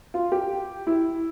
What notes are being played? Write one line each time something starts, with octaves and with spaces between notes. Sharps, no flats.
F4
G4
E4